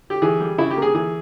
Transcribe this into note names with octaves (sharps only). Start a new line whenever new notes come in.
G4
E3 G#4
G3
C#3 E4
G4
A#3
G#4
E3 G#4